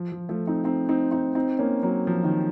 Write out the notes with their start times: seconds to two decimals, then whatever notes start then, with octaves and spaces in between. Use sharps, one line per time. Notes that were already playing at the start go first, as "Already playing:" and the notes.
Already playing: F3
0.12 F3
0.29 F3 A3
0.47 C4 D#4
0.64 C4 D#4
0.89 C4 D#4
1.11 C4 D#4
1.35 C4 D#4
1.59 A#3 C#4
1.83 F#3 A#3
2.07 F3
2.24 D#3